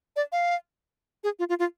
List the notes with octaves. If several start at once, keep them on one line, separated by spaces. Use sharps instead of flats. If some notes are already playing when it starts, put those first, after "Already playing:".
D5
F5
G#4
F4
F4
F4